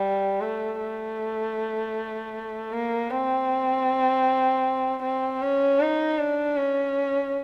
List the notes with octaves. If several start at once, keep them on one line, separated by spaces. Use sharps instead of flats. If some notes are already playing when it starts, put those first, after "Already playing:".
Already playing: G3
A3
A3
A#3
C4
C4
C#4
D#4
D4
C#4